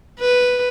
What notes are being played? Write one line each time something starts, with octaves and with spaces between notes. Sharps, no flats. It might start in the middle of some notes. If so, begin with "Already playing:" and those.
B4